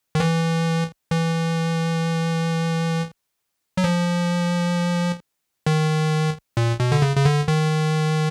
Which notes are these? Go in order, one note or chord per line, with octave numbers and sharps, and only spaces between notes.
D#3
E3
E3
F#3
F3
D#3
A#2
B2
D3
C#3
C#3
D3
D#3